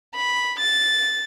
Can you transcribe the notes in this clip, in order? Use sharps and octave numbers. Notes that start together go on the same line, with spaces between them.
B5
A6